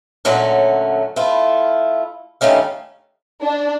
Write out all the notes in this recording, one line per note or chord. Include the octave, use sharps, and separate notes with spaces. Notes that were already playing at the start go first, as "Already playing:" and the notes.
A#2 D3 F#3 A3 C#4
A3 E4 F4
G2 D#3 A3 C#4 F5
D4